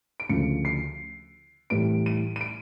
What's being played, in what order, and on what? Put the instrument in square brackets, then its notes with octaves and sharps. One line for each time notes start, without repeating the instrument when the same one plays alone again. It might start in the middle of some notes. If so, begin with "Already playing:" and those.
[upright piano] D7
D2 C#3 F3 C#7
C7
A2 E3 G3 D7
D#7
D#7
D7